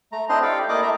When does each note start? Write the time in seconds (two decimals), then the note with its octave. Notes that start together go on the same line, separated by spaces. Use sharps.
0.12 A3 A#5
0.29 C4 D4 E4 C5 D#5 C6
0.42 G4 A4 D5 F5 G5
0.69 A3 A#3 E4 D5 D#5 D6
0.82 D#5 E5 A#5